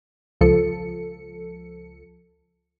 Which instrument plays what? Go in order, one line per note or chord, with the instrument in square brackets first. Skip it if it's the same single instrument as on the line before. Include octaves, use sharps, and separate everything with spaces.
[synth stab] C#2 F3 A4 C#7